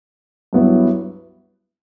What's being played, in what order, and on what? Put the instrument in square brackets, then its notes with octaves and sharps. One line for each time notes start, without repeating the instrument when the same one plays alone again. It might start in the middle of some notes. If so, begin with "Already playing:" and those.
[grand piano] G2 F#3 B3 E4